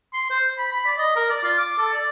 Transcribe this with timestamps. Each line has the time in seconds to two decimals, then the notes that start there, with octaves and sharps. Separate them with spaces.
0.13 C6
0.30 C5
0.58 B5
0.72 B5
0.86 D5
0.98 D#5
1.16 A#4
1.30 D5
1.44 F4
1.58 D6
1.78 A4
1.94 D5